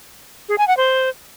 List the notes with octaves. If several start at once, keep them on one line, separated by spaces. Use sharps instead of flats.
G#4
G#5
F#5
C5